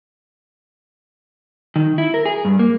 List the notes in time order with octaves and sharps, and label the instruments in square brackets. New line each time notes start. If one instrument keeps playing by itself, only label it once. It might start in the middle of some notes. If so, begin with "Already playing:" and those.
[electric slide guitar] D#3
E4
A#4
G#4
G2
A#3